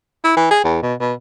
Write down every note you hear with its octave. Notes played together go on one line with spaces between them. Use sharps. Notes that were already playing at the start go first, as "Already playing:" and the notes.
E4
E3
G#4
E2
B2
B2